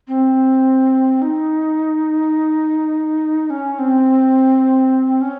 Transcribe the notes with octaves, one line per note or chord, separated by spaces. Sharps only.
C4
D#4
C#4
C4
C#4